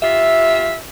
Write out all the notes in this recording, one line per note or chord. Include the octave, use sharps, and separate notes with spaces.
F4 G4 E5